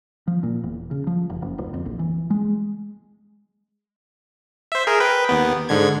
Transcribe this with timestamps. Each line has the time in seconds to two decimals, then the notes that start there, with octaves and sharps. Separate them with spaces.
0.28 F3
0.43 A#2
0.64 E1
0.91 C#3
1.07 F3
1.30 F1
1.42 F#1
1.58 D1
1.74 F2
1.86 A#1
1.99 E3
2.30 G#3
4.72 C5 E5
4.87 G#4 A#4
5.00 B4 G5
5.29 D#2 B3
5.69 G#2 D3 G#6